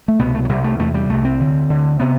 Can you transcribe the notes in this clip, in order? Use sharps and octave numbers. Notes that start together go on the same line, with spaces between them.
A3
C2 B2 B3
A3
F#3
C2 C3 G3
A3
E2 C3 A3
G3
C2 C3 A3
C4
D2 D3
D2 D3
C3 B3